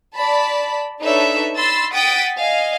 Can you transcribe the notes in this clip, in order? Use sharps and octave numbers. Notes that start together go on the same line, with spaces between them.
D5 A5 B5
D4 D#4 A4 B4 C#5 E5
B5 C6 E6 A6
F#5 G5 D#6 A6 B6 D7
D#5 F5 G#5